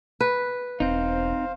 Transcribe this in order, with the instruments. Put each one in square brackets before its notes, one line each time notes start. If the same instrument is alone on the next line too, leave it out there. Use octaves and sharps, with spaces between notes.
[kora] B4
[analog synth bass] E1 [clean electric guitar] C4 D#4 [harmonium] C5 F5